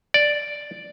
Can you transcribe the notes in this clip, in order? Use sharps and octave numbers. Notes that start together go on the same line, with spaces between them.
D5